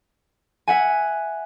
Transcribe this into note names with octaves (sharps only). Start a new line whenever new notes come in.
E5 F#5 G#5